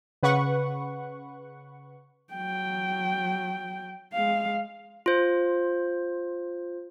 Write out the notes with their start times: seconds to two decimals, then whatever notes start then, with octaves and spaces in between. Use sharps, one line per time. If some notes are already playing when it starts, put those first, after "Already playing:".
0.23 C#3 B4 F#5 C#6
2.34 F#3 G5
4.13 G#3 F5
5.06 F4 C5